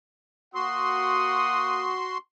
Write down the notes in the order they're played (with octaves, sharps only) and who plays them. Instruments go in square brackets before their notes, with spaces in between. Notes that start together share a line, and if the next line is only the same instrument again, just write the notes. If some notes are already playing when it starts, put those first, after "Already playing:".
[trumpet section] A#3 F#5 D#6 [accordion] F#4 C6